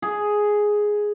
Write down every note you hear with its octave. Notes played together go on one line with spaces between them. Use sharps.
G#4